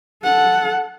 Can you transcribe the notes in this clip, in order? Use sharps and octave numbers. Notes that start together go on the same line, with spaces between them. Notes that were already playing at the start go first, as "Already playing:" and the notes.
A4 F#5